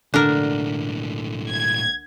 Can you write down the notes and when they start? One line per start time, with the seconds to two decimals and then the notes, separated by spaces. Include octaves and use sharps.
0.14 B1 A2 D3 D4 A#4
1.51 G#6